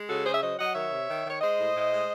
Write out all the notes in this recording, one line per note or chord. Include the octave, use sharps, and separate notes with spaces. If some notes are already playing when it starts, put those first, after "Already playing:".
Already playing: G#3
C#3 F#4 A4
C#3 G#4 C5
E5
F#3 C5 D#5
F#3 D#5 F#5
D#3 C#5 E5
C3
D#3
D#3 C#5
G#3 C5 D#5
A2
A2
G#3